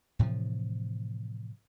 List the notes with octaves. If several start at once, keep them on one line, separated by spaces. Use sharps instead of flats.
A2 C3 E3 F3